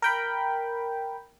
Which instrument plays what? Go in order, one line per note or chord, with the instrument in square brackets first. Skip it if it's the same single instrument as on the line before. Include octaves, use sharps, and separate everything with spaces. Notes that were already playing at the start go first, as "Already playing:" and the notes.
[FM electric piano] A#4 G5 B5